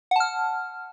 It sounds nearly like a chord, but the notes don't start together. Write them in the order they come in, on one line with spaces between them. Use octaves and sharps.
F#5 A5 F6